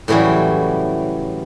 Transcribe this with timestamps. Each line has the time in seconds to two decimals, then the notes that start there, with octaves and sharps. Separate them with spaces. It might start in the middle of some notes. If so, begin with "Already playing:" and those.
0.08 A2 C#3 E3 F#3 G3